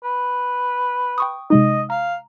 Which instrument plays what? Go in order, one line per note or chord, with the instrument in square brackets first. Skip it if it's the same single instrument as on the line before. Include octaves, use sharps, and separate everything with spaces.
[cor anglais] B4
[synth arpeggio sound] G5 C#6 D#6
[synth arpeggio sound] C3 G#3 D#4 [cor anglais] D#5
[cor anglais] F5 [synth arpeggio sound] A#5